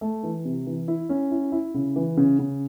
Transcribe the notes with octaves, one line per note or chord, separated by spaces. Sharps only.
A3
E3
C3
E3
E4
C#4
E4
E4
C#3
E3
C#3
C#3